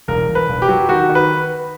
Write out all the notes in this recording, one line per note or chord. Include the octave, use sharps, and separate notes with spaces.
E1 A#4
E1
B4
E1
G4
F#3
D#3 F#4
D#3
B4